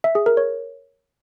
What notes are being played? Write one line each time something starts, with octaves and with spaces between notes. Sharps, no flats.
E5
G#4
A#4
C#5